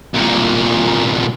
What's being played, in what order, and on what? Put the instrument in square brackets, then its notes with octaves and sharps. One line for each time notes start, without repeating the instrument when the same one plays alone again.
[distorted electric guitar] C2 A#2